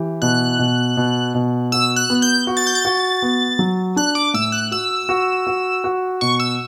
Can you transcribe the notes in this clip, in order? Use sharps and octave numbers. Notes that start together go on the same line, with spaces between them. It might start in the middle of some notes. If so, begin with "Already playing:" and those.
Already playing: E3 G4
B2 F#6
B2
B2
B2
F#4 E6
F#6
B3
G6
F#4
A6
G6
A6
F#4
B3
F#3
D4 F#6
D6
A2 E6
F#6
F#4 E6
F#4
F#4
F#4
B2 C#6
E6